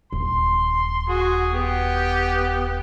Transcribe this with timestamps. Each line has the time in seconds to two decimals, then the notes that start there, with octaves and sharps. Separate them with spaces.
0.13 D#1 C6
1.08 F#4 G#4
1.54 B3 G4